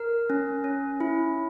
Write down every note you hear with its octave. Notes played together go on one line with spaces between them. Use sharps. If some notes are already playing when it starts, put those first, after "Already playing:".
Already playing: A#4
C#4
C#4
E4